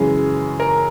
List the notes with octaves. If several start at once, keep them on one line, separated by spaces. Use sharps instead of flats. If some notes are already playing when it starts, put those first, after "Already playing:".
Already playing: F#2 C#3 E3 G#3 G#4
A#4